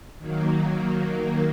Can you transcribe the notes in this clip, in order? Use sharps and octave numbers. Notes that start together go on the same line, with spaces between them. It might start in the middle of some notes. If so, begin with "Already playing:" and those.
D#3 F#3 A#3